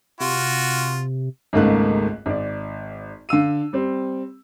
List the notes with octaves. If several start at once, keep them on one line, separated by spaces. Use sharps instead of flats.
C3 F4 F#4
G#1 C#2 G#2 A3 A#3 F#6
G#1 D5
D3 F5 E6 D#7
G3 C4